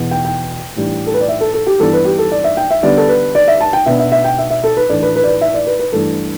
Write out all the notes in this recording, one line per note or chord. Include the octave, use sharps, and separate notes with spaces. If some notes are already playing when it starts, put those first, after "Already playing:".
Already playing: E2 B2 B3
G5
G5
A2 E3 G3 D4
A4
B4
D5
E5
A4
A4
G4
G2 E3 B3 D4 A4
B4
G4
A4
D5
E5
G5
E5
D3 G3 B3 D4 D5
A4
B4
D5
E5
A5
G5
B2 B3 D4 E5
E5
E5
G5
E5
E5
A4
B4
A2 E3 A3 D4 D5
B4
B4
D5
B4
E5
D5
B4
B4
G2 E3 A3 D4 A4